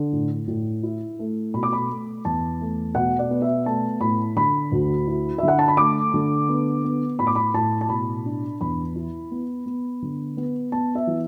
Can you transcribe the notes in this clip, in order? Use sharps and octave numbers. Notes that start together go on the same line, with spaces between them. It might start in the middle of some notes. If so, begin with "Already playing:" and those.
Already playing: D3
A2
A2
E4
A3
B2 B5
D6
B5
A3
E2 A5
A3
B2 F#5
D5
B3
E5
A3 A5
A2 B5
D3 B5
D2
E4
D3 E5
F#5
A5
B5
A3 D6
D3
B3
B3
A2 B5
D6
B5
A2 A5
A5
B2 B5
D4
E2 B5
E4
B3
B3
D3
B3
B3 A5
E5
E3